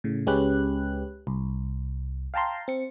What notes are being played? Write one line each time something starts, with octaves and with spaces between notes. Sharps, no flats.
A2 C#3
C#2 G#3 C#4 G4 B4 F#6
C2
F5 G5 A5 A#5 C6
C4 C#7